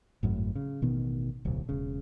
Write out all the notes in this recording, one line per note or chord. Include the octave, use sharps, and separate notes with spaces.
G#1 F#2 A2
C#3
A1 B2 D#3 B3
D1 B1
E1 C#3